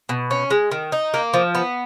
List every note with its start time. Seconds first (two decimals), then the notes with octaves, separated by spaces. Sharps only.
0.09 B2
0.31 C#4
0.50 G#3
0.71 D#3
0.92 D#4
1.14 A#3
1.34 F3
1.55 B3